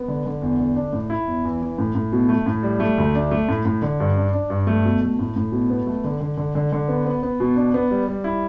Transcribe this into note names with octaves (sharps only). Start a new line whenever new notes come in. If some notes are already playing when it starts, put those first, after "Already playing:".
Already playing: B3
D3
D3
E2
D3
D4
A2
E4
E2
E3
E3
A2
A2
B2
A3
A2
G3
A3
D2
D4
A3
A2
A2
D3
G2
D4
D4
G2
A3
B2
A3
A2
A2
B2
B3
A3
D3
D3
D3
D3
D3
B3
B3
B3
B2
D4
B3
G3
G3
E4